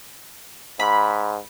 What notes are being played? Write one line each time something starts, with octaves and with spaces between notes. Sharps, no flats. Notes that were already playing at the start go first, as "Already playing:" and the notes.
G#2 B5